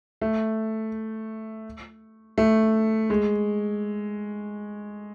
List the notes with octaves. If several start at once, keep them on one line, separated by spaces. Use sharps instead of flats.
A3
A3
G#3